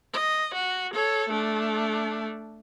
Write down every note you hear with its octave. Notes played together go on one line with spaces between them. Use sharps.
D#5
F#4
A4 C#5
A3 D4